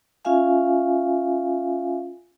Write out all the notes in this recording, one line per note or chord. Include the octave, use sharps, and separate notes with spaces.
C#4 F4 E5 F5 G#5